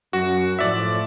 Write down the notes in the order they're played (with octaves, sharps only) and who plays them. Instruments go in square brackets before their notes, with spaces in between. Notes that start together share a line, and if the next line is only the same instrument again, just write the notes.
[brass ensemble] F#2 [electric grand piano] F#4
[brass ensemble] A2 F3 [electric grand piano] D5 E5